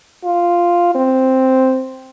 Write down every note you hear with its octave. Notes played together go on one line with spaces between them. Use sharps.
F4
C4